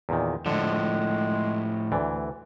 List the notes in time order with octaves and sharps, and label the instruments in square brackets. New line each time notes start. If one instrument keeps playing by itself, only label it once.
[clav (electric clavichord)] E2 A#2 D#3
[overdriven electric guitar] A2 F3 [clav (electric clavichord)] D3 [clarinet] G#3
[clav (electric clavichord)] D2 E3 D5